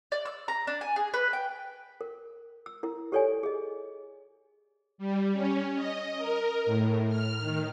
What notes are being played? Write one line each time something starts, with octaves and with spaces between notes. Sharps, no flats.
D5
E6
A#5
D4
G#5
G#4
B4
G5
A#4
E6
E4 A#4
G4 A4 C#5 D5 G#5
G#4 D#5
G3
C#4
D#5
A#4
A2
F6
D#3